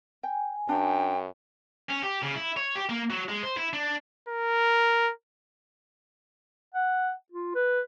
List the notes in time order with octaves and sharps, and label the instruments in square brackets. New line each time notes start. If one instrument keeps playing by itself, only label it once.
[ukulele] G5 [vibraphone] G#5
[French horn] F#2 [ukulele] D4 [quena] G5
[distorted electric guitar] C#4
G4
C#3
E4
C#5
G4
A#3
F#3
G#3
C5
E4
D4
[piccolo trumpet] A#4
[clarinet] F#5
F4
B4